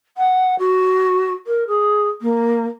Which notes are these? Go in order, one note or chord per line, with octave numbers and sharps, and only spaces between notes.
F#5
F#4
A#4
G#4
A#3